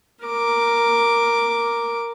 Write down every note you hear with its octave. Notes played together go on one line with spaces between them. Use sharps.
A#4 D6